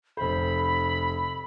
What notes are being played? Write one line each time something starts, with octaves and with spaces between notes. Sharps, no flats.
F1 C5 B5